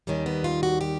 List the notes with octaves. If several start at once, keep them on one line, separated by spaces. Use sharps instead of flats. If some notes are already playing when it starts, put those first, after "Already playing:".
D#2 D#3 G3 C#4
B3
F4
F#4
G4